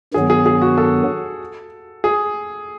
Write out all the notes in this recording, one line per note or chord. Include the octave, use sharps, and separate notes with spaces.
G2 D#3 F#3 B3 G#4
G#4
G#4
F#4
A4
G#4